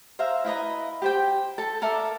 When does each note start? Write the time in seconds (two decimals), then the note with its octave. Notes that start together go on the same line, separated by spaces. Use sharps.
0.19 C5 E5 F5 A#5
0.45 E4 B4 D#5 A#5
1.02 G4 C5 G5
1.58 A4 A5
1.82 A4 A#4 D5 E5